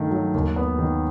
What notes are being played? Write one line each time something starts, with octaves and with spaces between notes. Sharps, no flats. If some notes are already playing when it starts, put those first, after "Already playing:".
Already playing: G2 D#3 A3
F#3
D#2
B3
D#3